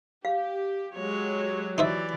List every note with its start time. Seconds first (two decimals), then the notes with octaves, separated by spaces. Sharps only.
0.25 G4 F5
0.95 F#3 G#3 G4 C#5
1.78 E3 D#4 C5 D5 E5